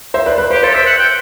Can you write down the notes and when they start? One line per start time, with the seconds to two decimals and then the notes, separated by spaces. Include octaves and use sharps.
0.14 C5 E5
0.26 B4 D5
0.38 B4
0.50 G4 C5
0.63 A4 C5
0.74 E5
0.86 F#5
0.98 G5